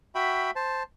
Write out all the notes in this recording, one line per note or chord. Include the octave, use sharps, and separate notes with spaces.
F#4 E5 G5 B5
C5 A5